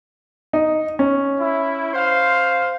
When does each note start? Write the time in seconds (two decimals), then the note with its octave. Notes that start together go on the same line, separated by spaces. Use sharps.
0.53 D#4
0.99 C#4
1.40 E4
1.94 C5 F5